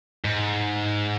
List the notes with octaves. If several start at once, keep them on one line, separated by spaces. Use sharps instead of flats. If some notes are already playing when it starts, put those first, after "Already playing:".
G#2